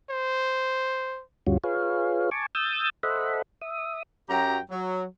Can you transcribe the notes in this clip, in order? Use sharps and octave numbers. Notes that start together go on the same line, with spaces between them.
C5
D2 G2 G3 C#4 F4 F#4
F4 G#4 B4 C#5 F5
G#5 A5 C#6 D6
D#6 E6 G6 A6
A4 C5 D#5 E5 F#5 B5
E5 D#6
F#2 F#3 G4 G5 A#5
F#3